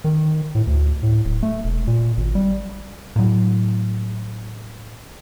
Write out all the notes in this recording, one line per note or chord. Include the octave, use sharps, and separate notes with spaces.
D#3
A2
D2
A2
D1
A3
E1
A#2
G#1
G3
A2 F#3